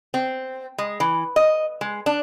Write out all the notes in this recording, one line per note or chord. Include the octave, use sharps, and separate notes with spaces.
C4
G#3
E3
D#5
G#3
D4